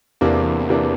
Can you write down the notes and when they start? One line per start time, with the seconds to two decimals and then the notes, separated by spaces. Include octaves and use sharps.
0.21 E2 C3 E3 A#3 D4
0.69 C3 E3 A#3 D4